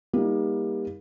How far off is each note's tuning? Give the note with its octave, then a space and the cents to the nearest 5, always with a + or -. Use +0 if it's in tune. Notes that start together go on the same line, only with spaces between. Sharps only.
G3 +25 A#3 +30 D#4 +40